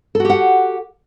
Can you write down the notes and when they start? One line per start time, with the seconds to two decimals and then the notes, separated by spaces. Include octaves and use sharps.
0.15 A4
0.20 F#4
0.25 G4
0.30 F#5